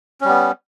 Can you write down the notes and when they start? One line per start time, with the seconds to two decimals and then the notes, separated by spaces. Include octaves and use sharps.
0.21 C#4
0.25 G3
0.29 B3